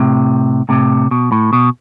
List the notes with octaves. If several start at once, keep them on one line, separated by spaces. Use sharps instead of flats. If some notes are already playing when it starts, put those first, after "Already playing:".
Already playing: A2 C3
A2 C3
B2
A2
B2